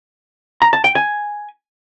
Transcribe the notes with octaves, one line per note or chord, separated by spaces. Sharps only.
A#5
A5
G5
G#5